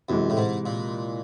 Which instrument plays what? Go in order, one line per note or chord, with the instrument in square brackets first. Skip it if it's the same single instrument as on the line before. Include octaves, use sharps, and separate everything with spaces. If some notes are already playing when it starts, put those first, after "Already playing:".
[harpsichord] F#2 [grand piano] C3 E3 G#3
[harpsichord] A2
G#2
A#2